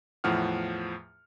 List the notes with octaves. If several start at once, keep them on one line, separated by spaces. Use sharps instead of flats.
E2 A2 F3 F#5 F6